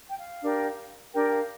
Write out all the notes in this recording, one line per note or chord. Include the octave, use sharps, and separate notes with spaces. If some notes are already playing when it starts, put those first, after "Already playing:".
G5
F5
D4 G4 A#4
D4 G4 A#4 G5
F5